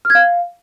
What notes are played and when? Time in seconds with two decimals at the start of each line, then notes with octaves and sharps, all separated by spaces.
0.05 F6
0.10 G#6
0.15 F5